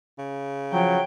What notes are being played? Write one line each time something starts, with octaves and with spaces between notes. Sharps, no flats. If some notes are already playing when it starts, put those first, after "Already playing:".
C#3
F3 F#3 G5